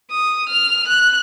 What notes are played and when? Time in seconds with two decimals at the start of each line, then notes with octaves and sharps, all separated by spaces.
0.11 D#6
0.49 F6
0.88 F#6